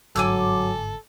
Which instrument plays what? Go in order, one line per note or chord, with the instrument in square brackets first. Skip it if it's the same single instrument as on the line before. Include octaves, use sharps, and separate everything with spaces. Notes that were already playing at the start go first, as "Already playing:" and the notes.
[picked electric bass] G1 G#2 D3 [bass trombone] F#3 [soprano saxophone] A4 [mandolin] G#5 D6 E6